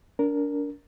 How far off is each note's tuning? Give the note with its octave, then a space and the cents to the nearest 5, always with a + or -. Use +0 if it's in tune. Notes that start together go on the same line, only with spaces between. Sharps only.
D4 -30 A#4 +0